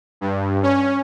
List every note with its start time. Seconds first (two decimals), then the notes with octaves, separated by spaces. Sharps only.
0.21 G2
0.63 C#4